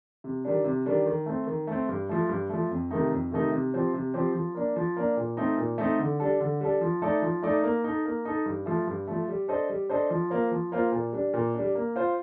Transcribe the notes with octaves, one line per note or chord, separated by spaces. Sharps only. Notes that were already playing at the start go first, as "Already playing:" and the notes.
C3
D#3 G3 D4
C3
D#3 G3 D4
D#3
A3 C4
D#3
A3 C4
G2
F3 A3
G2
F3 A3
F2
C3 D#3 A3 D#4
F2
C3 D#3 A3 D#4
C3
F3 C4 G4 C5
C3
F3 C4 G4 C5
F3
A#3 D4
F3
A#3 D4
A#2
A3 C4 D#4
A#2
A3 C4 D#4
D3
G3 D4 A4
D3
G3 D4 A4
F3
A3 D#4 A4 D5
F3
A3 D#4 A4 D5
A#3
D#4 A4
A#3
D#4 A4
G2
F3 A3
G2
F3 A3
G3
D4 A4 C5 D#5
G3
D4 A4 C5 D#5
F3
A#3 F4 C5
F3
A#3 F4 C5
A#2
G3 D4
A#2
G3 D4
A#3
F4 C5